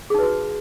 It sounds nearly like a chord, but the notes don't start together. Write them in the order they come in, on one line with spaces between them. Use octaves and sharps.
G#4 D#4 B4 F#4